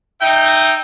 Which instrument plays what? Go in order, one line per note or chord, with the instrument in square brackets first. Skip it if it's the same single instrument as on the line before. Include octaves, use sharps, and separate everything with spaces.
[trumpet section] D#4 E5 G5